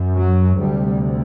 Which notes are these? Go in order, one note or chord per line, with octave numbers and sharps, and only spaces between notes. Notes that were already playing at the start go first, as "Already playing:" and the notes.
Already playing: F#2
F#3
D2 C3 G3